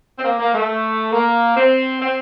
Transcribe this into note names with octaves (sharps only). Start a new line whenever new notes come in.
C4
A#3
A#3
A3
A#3
C4
C4